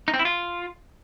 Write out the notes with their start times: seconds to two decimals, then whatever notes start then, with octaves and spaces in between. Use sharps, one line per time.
0.08 D#4
0.14 C4
0.19 E4
0.25 F4